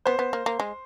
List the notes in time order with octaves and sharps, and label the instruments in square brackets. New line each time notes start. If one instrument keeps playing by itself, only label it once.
[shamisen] B3 [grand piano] C5
[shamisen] B3
A#3
A#3
G#3